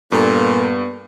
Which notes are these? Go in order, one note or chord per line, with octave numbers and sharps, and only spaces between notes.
G2 A#2 B3 A4